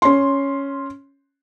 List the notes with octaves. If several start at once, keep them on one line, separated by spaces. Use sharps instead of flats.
C#4 C6